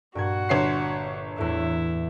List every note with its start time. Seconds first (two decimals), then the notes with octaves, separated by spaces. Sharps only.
0.15 G2 A#2 F#4 F#5 G#6
0.49 G1 C#5 C6 C7 E7
1.38 E2 A2 E4